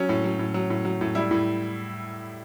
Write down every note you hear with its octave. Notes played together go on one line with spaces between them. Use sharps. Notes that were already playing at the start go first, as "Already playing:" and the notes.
Already playing: F#3 C#4
A2
F#3
A2
F#3
A2
F#3
A2
G3 E4
A2